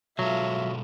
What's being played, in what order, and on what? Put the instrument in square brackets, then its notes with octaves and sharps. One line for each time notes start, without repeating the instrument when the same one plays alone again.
[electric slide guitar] B2 G#3 A4 [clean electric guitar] F#3 [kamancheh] F4 E5